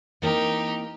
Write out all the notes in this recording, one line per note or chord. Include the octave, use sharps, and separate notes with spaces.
E3 A#3 C4 D#4 G4